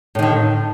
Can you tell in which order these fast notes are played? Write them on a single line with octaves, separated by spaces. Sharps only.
A2 D#3 D3